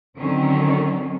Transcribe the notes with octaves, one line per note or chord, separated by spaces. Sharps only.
D3 D#3 F#3 C4 C#4